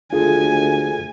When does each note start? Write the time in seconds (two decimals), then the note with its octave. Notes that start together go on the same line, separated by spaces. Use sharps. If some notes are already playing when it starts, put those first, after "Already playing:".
0.13 D2 F4 G#4 A4 G#5